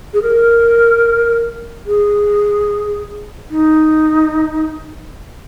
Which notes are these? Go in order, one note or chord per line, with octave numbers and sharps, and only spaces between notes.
G#4
A#4
G#4
D#4